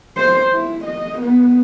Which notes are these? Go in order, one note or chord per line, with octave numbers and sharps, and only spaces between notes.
C5
E4
D#5
B3